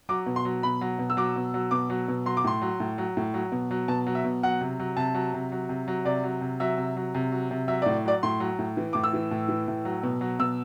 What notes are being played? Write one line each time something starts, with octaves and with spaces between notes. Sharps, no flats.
F#3 D6
B2
C6
F#3
B2 B5
F#3
B2
E6
F#3 D6
B2
F#3
B2 D6
F#3
B2
F#3 C6
D6
A2 C6
F#3
A2
F#3
A2
F#3
B2
F#3
B2 A5
F#3
E5
B2
F#3 F#5
C3
F#3
C3 A5
F#3
C3
F#3
C3
F#3
C3 D5
F#3
C3
F#3 E5
C3
F#3
C3
F#3
C3
F#3 E5
A2 D5
F#3 D5
A2 C6
F#3
A2
E3
A2 D6
E6
E3
A2
E3
A2
F#3
B2
F#3
B2 E6